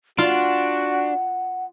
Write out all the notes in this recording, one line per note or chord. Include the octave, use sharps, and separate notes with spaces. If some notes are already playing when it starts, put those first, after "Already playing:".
D4 F4 F#4 F#5